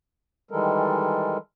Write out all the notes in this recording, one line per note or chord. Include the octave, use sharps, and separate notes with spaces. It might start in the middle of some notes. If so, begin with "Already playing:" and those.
D#3 E3 G3 G#3 A4 A#4